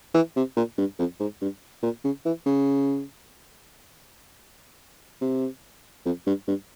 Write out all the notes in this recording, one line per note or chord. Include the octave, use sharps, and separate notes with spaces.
E3
C3
A#2
G2
F2
G#2
G2
A#2
C#3
E3
C#3
C3
F2
G2
G2